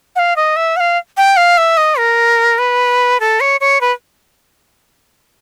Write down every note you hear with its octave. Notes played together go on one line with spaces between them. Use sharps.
F#5
F5
D#5
E5
F#5
F5
G5
F5
E5
D#5
A#4
B4
A4
C#5
C#5
B4